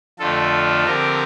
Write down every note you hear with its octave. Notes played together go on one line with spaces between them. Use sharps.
F2 D3 F3 A3 F4 A4
D3 F3 C4 G4 A#4